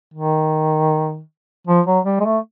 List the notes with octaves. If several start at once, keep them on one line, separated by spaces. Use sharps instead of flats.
D#3
F3
F#3
G3
G#3
A3